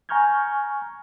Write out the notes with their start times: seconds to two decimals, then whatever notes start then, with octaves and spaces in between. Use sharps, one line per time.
0.09 G#5 A#5 C#6 F6 G6 G#6